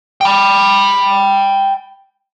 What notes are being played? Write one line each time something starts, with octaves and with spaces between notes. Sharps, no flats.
G5 B5